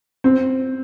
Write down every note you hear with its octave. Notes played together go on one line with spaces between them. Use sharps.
C4